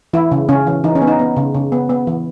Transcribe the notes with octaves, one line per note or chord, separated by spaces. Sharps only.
E3 E4
C#3
C#3 C#4
E3
E3 D#4
C#4
B3
D#4
B3
C#3
C#3
B3
B3
E3